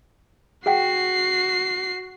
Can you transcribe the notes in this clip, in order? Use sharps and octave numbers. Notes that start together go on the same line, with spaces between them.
F#4 G#4 F#5 G5 C7